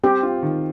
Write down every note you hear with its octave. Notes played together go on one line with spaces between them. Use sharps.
C4 G4
F4
D#3